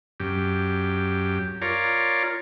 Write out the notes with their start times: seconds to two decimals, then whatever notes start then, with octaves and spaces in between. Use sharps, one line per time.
0.20 F#2 G4
1.62 F4 A#4 C#5 D5